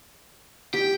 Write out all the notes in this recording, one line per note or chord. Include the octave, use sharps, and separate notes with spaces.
G4 G5